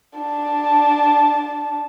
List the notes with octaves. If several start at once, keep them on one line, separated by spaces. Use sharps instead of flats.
D4 A5